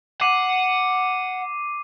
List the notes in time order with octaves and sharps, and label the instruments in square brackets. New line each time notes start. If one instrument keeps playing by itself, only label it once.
[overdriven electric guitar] F#5 [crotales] D6 C7 D#7